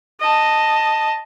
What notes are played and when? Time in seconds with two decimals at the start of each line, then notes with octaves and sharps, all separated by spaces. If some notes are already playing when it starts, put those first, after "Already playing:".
0.20 D#5 A5